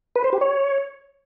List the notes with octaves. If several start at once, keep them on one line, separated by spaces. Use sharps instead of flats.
B4
C5
G4
C#5